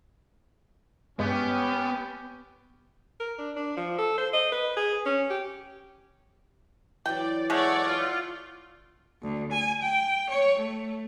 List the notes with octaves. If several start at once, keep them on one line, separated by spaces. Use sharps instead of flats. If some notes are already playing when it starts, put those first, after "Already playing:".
G2 G#3 B3 C#4 G4
A#4
D4
D4
F3
A4
C5
D#5
B4
G#4
C#4
G4
E3 F#3 D5 G5
G#3 A3 C#5 D5 F#5
F4
D2
G#5
G5
C#5
A3